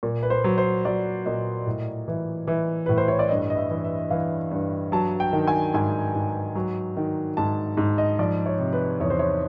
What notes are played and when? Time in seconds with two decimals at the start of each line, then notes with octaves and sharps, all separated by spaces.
0.03 A#2
0.23 B4
0.30 C5
0.44 F#3
0.58 C5
0.85 F#3 D5
1.26 A#2 D#5
1.67 A2
2.08 E3
2.48 E3
2.86 A2 B4
2.98 C5
3.08 C#5
3.19 D5
3.29 G2 D#5
3.50 D#5
3.57 E5
3.70 E3
3.84 E5
4.11 E3 F5
4.51 G2
4.92 F#3 A5
5.20 G5
5.33 D#3
5.47 G#5
5.74 G#2 G#5
6.15 G#2
6.55 F#3
6.97 D#3
7.37 G#2 A5
7.77 G#2
7.98 D#5
8.19 F3 D5
8.46 C#5
8.59 C3
8.73 B4
9.00 E2 C#5
9.10 C5
9.19 C#5